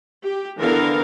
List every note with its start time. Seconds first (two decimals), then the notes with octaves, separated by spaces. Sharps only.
0.22 G4
0.58 D3 E3 B3 A#4 F5